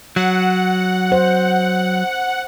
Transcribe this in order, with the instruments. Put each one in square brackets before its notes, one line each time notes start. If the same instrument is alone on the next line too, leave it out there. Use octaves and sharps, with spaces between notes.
[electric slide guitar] F#3 [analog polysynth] F#5
[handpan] C5